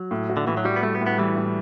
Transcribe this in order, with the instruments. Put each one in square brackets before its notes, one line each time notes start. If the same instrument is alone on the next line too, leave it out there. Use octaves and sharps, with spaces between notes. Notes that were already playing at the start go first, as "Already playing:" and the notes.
Already playing: [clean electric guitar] F#3
[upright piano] A2
F#4
[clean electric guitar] D3
[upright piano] A2 [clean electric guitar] E3
[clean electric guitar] F#3
[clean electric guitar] G3 [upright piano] F#4
[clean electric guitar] B3
[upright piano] G3 [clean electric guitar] A3
[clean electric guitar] B3
[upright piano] A2
[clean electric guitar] B3
[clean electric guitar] E3 [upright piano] G3
[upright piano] A2